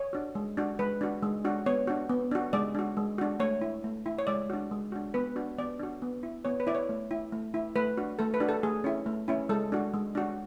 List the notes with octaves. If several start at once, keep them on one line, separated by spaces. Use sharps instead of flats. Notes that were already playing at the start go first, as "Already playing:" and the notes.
Already playing: C#5
D4 F#4
G#3
D4 F#4
G#3 B4
D4 F#4
G#3
D4 F#4
B3 C#5
D4 F#4
B3
D4 F#4
G#3 D5
D4 F#4
G#3
D4 F#4
A3 C#5
E4
A3
E4
C#5
G#3 D5
D4 F#4
G#3
D4 F#4
B3 B4
D4 F#4
B3 D5
D4 F#4
B3
E4
B3 C#5
B4
E4 D5
C#5
A3
E4
A3
E4
A3 B4
D4 F#4
A3 A4
B4
D4 F#4
A4
A3 G#4
C#4 E4
A3
C#4 E4
G#3 A4
D4 F#4
G#3
D4 F#4